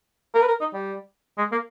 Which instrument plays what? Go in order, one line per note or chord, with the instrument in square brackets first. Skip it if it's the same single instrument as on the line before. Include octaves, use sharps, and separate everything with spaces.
[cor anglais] A#4
B4
A#4
D#4
G3
G#3
A#3